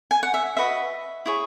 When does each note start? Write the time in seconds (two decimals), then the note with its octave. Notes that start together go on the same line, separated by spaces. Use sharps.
0.11 G#5
0.23 F#5
0.34 E5
0.57 F#4 B4 D#5 E5
1.26 E4 G#4 C#5